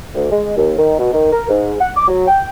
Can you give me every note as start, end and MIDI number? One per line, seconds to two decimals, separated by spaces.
0.15 0.27 38
0.31 0.53 56
0.57 0.74 39
0.77 0.94 51
0.98 1.09 47
1.12 1.27 51
1.32 1.48 70
1.48 1.74 44
1.79 1.90 78
1.96 2.05 86
2.08 2.27 54
2.28 2.49 79